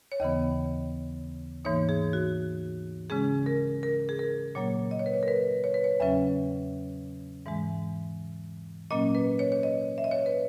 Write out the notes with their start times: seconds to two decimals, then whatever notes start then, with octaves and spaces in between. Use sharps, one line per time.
0.12 C#5
0.20 D#2 C#3 E3 B3 D#5
1.65 G#2 E3 A#3 D#4 C#5
1.89 G#4
2.13 F#4
3.10 C#3 G#3 C#4 G#4
3.46 A#4
3.83 A#4
4.09 G#4
4.19 A#4
4.55 A#2 F#3 A#3 C#5
4.91 D#5
4.99 C#5
5.06 B4
5.14 C#5
5.23 A#4
5.28 B4
5.64 C#5
5.74 B4
5.84 C#5
6.00 E2 C#3 F#3 C#4 E5
7.46 G#2 E3 G#3
8.91 A#2 F#3 A#3 C#4 D#5
9.15 B4
9.39 C#5
9.52 C#5
9.63 D#5
9.98 E5
10.04 D#5
10.11 C#5
10.26 B4